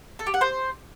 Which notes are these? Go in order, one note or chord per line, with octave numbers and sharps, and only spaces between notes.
A4
G4
F#5
C5